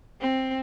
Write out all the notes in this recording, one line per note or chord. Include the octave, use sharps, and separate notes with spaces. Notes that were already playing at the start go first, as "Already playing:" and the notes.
C4